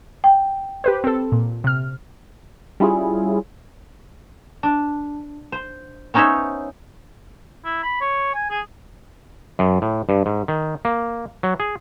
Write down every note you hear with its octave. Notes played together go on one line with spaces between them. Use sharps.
G5
G4 B4 C5
C4 A4
A#2
C3 F6
G3 C#4 E4 F4 G#4
D4
C5
B3 C#4 D#4 C5 C#5 E5
E4
B5
C#5
G#5
G#4
F#2
A2
G2
G#2
D#3
A#3
F#3
G#4